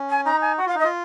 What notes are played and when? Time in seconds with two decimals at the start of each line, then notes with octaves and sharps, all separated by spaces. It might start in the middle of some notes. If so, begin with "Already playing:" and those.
Already playing: C#4
0.10 G#5
0.25 D#4 A#5
0.41 G#5
0.58 F#4 F#5
0.66 F4 F5
0.75 D#4
0.79 D#5
0.84 F4